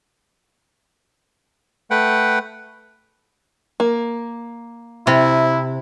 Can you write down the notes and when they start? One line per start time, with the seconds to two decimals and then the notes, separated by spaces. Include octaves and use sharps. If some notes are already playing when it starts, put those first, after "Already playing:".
1.91 A3 B4 F#5 G5
3.80 A#3
5.07 C3 E4